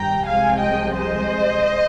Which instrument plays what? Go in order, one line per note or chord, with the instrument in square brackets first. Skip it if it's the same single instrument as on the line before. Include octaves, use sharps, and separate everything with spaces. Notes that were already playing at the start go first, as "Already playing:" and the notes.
Already playing: [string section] G1 G2 D#3 G3 G5 A#5
C2 C3 F3 G#3 F5 G#5
D#5 G5
C5 D#5